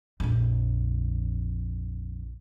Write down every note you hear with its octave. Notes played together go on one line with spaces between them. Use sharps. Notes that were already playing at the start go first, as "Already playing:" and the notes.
A#1 F2